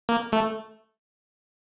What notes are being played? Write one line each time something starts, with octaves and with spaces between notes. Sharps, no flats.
A#3
A3